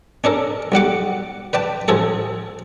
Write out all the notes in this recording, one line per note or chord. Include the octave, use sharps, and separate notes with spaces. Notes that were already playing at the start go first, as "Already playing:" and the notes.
C#4 D4 A4 A#4
B1 G3 F#5 D6
B4 D5 G5 A5
A1 C#3 F3 G#4 A4